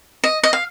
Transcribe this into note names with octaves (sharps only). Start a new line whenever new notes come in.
D#5
D#5
F5